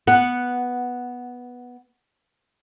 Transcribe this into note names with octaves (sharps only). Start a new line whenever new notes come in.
B3 F#5